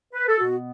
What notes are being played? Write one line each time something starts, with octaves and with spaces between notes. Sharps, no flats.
B4
A4
B2 B3 F#4